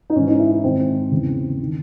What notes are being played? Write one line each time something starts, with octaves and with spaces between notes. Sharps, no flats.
D#4
G#2 E3 C#4
D#4
E4
E4
G#2 D#3 C4
E2 C#3 E3
D#3